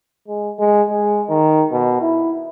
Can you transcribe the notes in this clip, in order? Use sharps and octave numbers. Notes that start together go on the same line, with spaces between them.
G#3
G#3
G#3
D#3
B2
E4